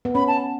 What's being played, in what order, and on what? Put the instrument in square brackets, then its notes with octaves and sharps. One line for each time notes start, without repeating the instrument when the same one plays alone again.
[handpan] B3
[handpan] C#4 [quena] B5
[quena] A5